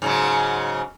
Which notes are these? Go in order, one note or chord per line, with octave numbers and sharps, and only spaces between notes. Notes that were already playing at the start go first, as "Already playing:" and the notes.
G#2 C#3 F#3